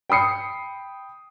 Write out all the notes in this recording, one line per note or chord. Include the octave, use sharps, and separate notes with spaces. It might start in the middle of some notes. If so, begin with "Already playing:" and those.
G5 B5 D#6 C7 C#7